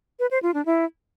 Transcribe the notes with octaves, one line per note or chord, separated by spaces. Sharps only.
B4
C5
F4
D4
E4